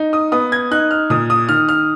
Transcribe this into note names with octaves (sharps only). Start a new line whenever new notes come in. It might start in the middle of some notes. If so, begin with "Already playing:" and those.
Already playing: D#4
D#6
B3 D#6
G#6
D#4 F#6
F6
A#2 D#6
D#6
D#3 F6
F6